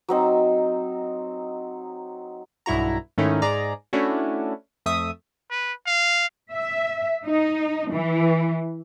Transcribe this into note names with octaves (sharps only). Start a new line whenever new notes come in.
F#3 C4 D#4
B1 G2 E4 F#4 A#5
G#2 D#3 A3 C#4 D#4 E4
G#2 G#4 D5 A#5
A3 C#4 D4 E4 F#4
F2 A3 E5 D#6
B4
F5
E5
D#4
E3